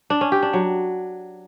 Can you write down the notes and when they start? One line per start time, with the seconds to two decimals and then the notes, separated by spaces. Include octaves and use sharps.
0.10 D4
0.21 C#4
0.32 G4
0.43 D4
0.53 F#3